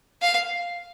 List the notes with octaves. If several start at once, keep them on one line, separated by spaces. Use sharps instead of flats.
F5